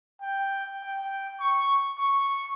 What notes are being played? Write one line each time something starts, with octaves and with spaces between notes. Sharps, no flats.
G5
G5
C#6
C#6